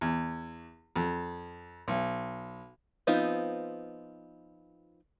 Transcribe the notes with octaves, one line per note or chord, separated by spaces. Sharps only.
E2
F2
B1
F3 B3 C4 D#4 F4